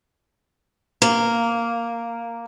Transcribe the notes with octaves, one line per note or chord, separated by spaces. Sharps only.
A#3